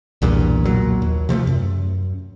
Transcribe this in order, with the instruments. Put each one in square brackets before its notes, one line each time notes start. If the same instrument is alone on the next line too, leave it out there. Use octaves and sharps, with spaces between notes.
[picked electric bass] B1 E2 G2 A#2
B1 A#2 F#3
D#2
C3 F3 G3 A3
F#2